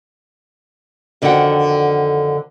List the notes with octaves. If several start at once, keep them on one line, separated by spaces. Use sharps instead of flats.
F2 D3 D#3 F#4 F#5 G5